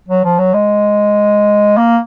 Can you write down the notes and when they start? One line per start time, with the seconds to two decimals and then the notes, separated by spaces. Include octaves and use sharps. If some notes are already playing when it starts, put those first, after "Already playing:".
0.08 F#3
0.24 F3
0.38 F#3
0.54 G#3
1.77 A#3